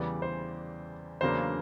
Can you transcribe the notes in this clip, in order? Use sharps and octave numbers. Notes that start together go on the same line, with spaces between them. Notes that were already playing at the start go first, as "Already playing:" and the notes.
Already playing: E2 C#3 E3 G3 D5
C5
E2 C#3 F#3 A#3 D4 C5